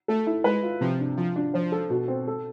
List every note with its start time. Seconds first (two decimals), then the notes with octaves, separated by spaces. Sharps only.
0.08 A3 A4
0.27 E4
0.44 G#3 B4
0.63 F4
0.81 C3 F3
0.99 D4
1.17 F3 F4
1.36 D4
1.54 F3 C5
1.72 A4
1.90 B2
2.08 C4
2.27 A4